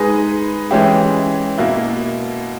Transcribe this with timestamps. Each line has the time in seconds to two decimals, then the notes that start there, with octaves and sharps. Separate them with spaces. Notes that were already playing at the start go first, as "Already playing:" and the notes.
Already playing: G#3 D#4 G#4 B4 D#5
0.71 E3 G#3 C#4 E4 G4
1.58 B2 A#3 E4